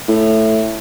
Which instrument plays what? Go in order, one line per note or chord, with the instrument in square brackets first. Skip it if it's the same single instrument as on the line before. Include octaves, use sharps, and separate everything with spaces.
[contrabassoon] A2